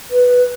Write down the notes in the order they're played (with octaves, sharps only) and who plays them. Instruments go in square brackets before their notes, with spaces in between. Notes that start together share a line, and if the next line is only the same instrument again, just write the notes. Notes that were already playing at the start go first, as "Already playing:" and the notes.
[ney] B4